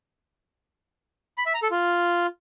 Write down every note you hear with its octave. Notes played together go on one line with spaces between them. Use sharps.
B5
E5
A#5
A4
F4